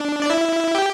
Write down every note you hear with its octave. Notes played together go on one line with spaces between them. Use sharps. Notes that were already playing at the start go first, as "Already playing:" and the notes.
Already playing: D4
D5
E4 E5
G4 G5